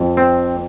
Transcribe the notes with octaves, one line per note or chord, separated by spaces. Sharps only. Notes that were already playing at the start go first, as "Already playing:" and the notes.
Already playing: F2
C4